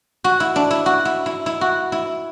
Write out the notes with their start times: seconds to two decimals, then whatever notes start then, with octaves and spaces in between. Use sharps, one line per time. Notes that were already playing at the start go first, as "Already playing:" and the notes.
0.24 F#4
0.40 E4
0.56 D4
0.71 E4
0.86 F#4
1.05 E4
1.26 E4
1.46 E4
1.61 F#4
1.92 E4